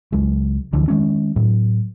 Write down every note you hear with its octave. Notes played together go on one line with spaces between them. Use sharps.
C#2 F#3 G#3
D2 D3 E3 F3
D#3 G#3 C#4
A2 F#3